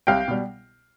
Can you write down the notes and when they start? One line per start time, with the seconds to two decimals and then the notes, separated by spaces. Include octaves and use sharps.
0.07 C2 F5 G5
0.28 B2 G3